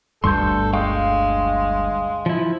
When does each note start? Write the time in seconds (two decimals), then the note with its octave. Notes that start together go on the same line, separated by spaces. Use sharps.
0.24 G1 D2 G2 A4 C6 C#6 G6
0.74 G#3 F5 G5 C#6
2.26 F3 E4